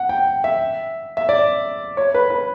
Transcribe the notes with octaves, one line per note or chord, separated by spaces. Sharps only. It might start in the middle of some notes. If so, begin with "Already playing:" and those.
Already playing: F#5
G5
E5
E5
D5
C#5
B4
B4